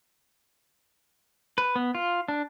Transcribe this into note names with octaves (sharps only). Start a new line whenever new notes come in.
B4
B3
F4
D4